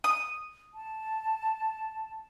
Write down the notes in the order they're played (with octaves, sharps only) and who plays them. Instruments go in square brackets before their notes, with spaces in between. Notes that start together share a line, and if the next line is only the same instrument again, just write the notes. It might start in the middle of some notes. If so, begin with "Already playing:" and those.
[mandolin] D#6
[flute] A5